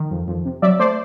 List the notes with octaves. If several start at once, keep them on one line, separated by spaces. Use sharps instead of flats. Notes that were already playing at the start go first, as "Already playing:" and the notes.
Already playing: D#3
F2
F2
C3
F#3 D5 E5
A3 C5 D5